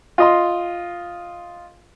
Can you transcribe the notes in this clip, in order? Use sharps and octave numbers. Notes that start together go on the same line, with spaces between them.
F4 D#5 C6